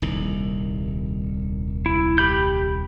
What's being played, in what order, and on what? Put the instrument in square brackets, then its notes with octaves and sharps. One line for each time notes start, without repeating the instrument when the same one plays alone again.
[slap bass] D#1 C2 D#3
[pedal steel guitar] E4
G4 B5 G6